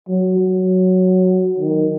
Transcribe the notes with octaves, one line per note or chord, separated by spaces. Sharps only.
F#3
F#3
D#3